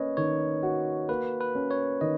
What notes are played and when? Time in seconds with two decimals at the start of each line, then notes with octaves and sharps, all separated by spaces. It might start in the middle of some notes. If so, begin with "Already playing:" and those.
Already playing: A#3 C#4 B4 C#5 D#5
0.17 D#3 C#5
0.63 F#4
1.09 A#3 B4
1.41 B4
1.55 C#4
1.71 C#5
2.01 D#3 D#5